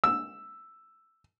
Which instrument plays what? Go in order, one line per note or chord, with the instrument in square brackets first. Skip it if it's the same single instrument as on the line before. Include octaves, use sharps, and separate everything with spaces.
[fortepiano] E6